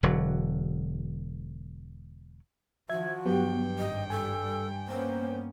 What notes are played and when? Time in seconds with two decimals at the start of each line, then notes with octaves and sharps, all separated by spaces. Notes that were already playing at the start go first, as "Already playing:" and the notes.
0.03 E1 D3 F#3
2.89 D#3 F3 F#4 E5 G#6
3.25 G2 F#3 B3 G4 G5
3.79 G#1 D#5
4.10 G3 A4 G#5
4.88 A#3 B3 C#4 C5